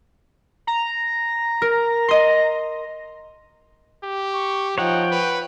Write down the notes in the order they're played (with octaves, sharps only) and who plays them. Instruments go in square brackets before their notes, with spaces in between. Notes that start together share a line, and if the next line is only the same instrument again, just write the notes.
[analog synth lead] A#5
[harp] A#4
D#5 C6
[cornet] G4
[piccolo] C#6
[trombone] F3 [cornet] D#4 [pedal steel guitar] C#5 F#5 [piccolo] G5
[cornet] B4